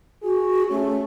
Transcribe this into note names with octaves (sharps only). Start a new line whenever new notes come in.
F#4 G#4
A3 C#4